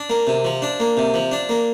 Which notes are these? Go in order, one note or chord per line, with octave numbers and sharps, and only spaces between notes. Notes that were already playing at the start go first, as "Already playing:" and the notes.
Already playing: D4
A#3
C3
F3
D4
A#3
C3
F3
D4
A#3